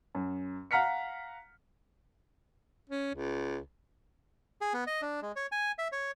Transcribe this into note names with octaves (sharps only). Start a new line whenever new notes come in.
F#2
F5 F#5 A#5 F6 B6 C#7
C#4
C#2
G#4
B3
D#5
D4
G#3
C#5
G#5
E5
C#5